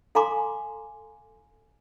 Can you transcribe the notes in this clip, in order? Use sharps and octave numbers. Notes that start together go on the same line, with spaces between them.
A4 F5 G#5 A#5 C6 D6